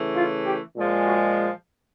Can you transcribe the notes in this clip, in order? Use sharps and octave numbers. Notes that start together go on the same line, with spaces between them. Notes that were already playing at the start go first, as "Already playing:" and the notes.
Already playing: C#3 E3 A3
F4
G4
A#2 F3 G#3
F#4